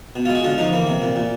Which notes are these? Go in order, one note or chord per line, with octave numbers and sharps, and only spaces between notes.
B2
F4
G#3
F#4
D3 F4
F3 D#4
E3 A#3
C3
A#2
A#2